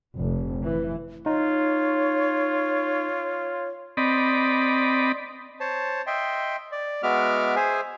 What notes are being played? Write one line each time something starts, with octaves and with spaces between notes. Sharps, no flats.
F1
E3
D#4 F4 C#5
C4 D5 D#5 B5
C5 C#5 A5
D#5 E5 G5 C6
D5
G#3 B3 F#4 E5 D6 F6
G#4 C5 E5 G#5